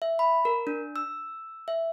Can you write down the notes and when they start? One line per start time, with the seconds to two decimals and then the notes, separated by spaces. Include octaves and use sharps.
0.02 E5
0.19 B5
0.45 A#4
0.67 D4
0.96 E6
1.68 E5